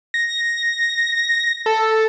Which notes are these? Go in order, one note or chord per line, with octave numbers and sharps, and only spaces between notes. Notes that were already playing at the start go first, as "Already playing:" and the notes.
A#6
A4